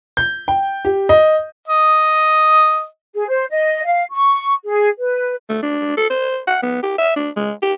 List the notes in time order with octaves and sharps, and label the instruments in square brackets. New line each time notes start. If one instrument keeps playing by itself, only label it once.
[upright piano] G6
G5
G4
D#5
[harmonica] D#5
[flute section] G#4
C5
D#5
F5
C#6
G#4
B4
[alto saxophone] A3
D4
A4
C5
F#5
B3
G4
E5
D4
G#3
G4